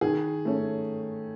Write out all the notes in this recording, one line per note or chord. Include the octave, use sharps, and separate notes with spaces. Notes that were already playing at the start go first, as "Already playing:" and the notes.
D#3 G#4
A3 C#4